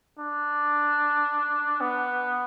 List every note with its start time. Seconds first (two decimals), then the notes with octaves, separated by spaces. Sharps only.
0.19 D4
1.81 B3